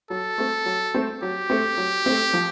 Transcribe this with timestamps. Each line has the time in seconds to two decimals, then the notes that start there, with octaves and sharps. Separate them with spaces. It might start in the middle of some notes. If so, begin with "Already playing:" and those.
0.10 F#3 A4
0.38 A3 C4
0.66 F#3
0.94 A3 C4
1.22 F#3 G4
1.50 A3 C4
1.77 F#3
2.06 A3 C4
2.33 F3